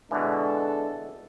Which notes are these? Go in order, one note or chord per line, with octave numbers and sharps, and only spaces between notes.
B2 D3 E3 G#3 D4 A4